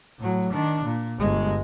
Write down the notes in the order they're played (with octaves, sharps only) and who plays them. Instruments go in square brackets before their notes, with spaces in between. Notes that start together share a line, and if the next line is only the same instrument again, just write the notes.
[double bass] A2 F#3
D#3 D4
A#2
G1 G#3